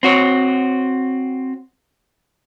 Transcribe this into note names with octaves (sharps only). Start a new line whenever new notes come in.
C4 F#4 C#5